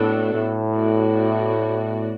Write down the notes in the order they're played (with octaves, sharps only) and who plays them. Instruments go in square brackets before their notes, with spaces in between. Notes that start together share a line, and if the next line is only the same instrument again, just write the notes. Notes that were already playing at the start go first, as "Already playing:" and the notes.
Already playing: [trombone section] A2 [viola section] B3 D4 F#4 A4
[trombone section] A2
[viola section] B3 F#4 D5